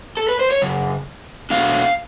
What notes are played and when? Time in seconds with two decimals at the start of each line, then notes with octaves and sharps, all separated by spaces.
0.17 A4
0.29 B4
0.39 C5
0.51 C#5
0.62 F#2 C#3
1.50 B2 F#3 A3 D4 F5